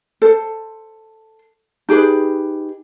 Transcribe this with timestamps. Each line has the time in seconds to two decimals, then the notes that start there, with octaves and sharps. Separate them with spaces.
0.22 A4 C5
1.89 D#4 G4 G#4 B4